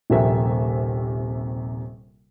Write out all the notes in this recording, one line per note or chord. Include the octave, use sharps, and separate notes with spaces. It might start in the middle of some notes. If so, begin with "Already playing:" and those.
D#1 A#1 C3 A#4 E5